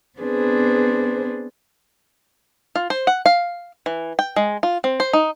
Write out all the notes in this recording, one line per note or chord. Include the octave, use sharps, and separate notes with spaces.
B3 C4 D4 G#4 B4 C5
F4
C5
F#5
F5
E3
G5
G#3
F4
C4
C5
D#4